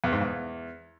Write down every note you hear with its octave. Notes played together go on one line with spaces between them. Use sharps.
E2
G#2
E2